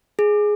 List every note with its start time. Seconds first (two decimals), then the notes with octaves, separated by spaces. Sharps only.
0.19 G#4